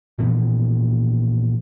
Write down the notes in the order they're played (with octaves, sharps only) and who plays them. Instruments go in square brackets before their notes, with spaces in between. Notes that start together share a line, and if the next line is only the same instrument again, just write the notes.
[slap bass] A#2 E3 F3 B3